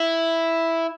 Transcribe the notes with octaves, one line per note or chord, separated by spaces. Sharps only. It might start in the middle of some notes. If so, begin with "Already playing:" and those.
Already playing: E4